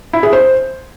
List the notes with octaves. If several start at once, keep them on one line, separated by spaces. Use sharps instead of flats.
E4
G#4
C5